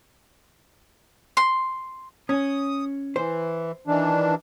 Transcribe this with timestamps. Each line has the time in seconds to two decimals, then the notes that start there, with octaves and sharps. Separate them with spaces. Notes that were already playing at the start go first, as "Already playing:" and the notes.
1.37 C6
2.29 C#4 D#6
3.16 E3 C5
3.87 D#3 E3 D4